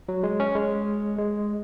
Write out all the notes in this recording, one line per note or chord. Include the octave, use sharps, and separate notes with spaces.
F#3
G#3
C#4
G#3
G#3